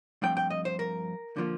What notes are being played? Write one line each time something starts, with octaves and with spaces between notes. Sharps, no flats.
G2 F3 A3 C4 G5
G5
D#5
C5
A#4
D3 F3 A#3